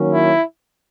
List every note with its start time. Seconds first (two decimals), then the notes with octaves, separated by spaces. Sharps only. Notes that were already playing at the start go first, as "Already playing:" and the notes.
Already playing: D#3 F#3 A#3 C#4
0.12 E4